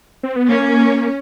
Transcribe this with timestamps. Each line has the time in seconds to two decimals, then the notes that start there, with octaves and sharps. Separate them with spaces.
0.23 C4
0.36 B3
0.49 A#3 C#4